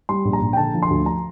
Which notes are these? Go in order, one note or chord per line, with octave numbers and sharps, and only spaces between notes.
G3 C6
A#1
A#5
A#1
G5
D3 A5
F3
C6
D2
A#5